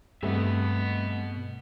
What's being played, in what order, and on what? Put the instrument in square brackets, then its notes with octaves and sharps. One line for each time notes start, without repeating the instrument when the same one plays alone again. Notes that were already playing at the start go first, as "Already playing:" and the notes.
[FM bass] G2 [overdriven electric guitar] B2 E5 [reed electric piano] G3 A3 C4 [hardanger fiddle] B3